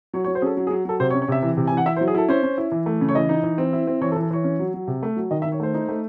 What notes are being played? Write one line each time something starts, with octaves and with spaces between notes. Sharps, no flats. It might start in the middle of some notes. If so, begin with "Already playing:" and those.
F#3 C#5
C#5
F#3
C5
C#4 G#4 A4
F#3
G#4
F#3
F#3 A4
C3 C5
C#5
C#4
C#5
C3 E5
E3
C3
G#5
E3
F#5
E4 E5
C5
F#3
G#4
E4 A4
C#4 C5
C#4
E4
E3
A3
C#3
C#5
E3 D#5
D#4
E3
C4
E4
C4
E3 C#5
A4
E3
A4
E3 C#5
C#4
F#3
F#3
C3
A3
F#3
D#3 D#5
E5
D#3
C#5
A3 C5
D#4
A3